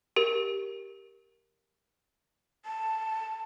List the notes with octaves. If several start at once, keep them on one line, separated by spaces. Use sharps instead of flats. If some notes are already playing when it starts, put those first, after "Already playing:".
G4 A#4
A5